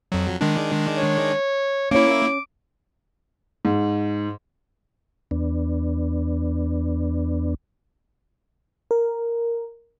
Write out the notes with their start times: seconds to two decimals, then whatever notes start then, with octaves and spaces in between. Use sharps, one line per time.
0.12 F2 F#3
0.41 D#3 G#3 D4
0.97 C#5
1.91 A#3 C#4 E4 C#5 D6
3.65 G#2
5.31 E2 B3 D4
8.91 A#4